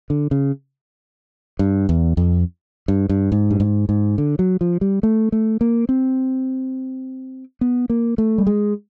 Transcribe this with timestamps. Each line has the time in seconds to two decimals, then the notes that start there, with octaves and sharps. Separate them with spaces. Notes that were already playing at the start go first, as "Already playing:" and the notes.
0.10 D3
0.31 C#3
1.59 G2
1.89 E2
2.17 F2
2.88 G2
3.09 G2
3.32 G#2
3.51 G2
3.60 G#2
3.89 G#2
4.18 D3
4.39 F#3
4.61 F3
4.81 G3
5.03 A3
5.32 A3
5.61 A#3
5.89 C4
7.61 B3
7.90 A#3
8.18 A3
8.38 G3
8.47 G#3